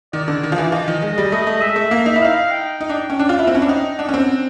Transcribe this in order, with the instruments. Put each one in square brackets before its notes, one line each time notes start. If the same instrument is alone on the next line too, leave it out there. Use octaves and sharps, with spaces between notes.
[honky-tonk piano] D#3 [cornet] D5
[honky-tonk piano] D3
D#3
F3
E3
[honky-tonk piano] F3 [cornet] D#5
[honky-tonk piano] D#3
G#3
G3
[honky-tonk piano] A3 [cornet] D#5
[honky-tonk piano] A3
[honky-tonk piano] G#3 [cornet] E5
[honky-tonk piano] A3
A#3
D#4
E4
[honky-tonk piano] D#4 [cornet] F5
[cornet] G5
[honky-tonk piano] D#4
D4
C#4
D4
F4
[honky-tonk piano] E4 [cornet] F#5
[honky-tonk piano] C4
C#4
D4
[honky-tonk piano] D#4 [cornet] G5
[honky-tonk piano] D4 [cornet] F#5
[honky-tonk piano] C#4
C4